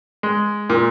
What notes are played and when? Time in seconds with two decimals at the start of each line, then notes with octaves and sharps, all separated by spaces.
0.23 G#3
0.70 A#2